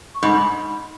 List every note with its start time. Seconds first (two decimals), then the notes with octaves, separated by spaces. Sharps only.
0.15 C#6
0.23 G#2 B5